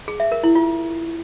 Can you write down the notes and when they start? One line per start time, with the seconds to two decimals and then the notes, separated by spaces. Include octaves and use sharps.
0.08 G#4
0.20 E5
0.32 A#4
0.44 E4
0.55 F4